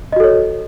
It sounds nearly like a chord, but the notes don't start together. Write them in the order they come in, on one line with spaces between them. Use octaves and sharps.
D#5 F#4 A4 C#5